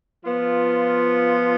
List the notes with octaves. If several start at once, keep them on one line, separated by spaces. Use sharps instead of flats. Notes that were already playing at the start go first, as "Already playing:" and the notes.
F3 B3 F4